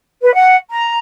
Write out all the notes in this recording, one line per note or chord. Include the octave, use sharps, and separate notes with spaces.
B4
F#5
A#5